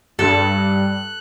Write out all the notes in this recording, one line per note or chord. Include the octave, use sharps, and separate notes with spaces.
G2 A4 F#6